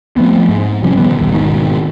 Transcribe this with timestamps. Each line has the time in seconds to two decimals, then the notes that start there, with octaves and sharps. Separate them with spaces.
0.17 F3 A3 B3 C4
0.49 G#2
0.83 C3 F3 G3 C#4
0.97 B2 D#3 G3 B3
1.18 A#1 D#2
1.32 G#2 B2 D#3